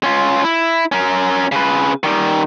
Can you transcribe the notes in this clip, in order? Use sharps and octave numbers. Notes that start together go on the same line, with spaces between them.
C#4 F4
E4
C#4 A#4
C#3 B4
D#3 G3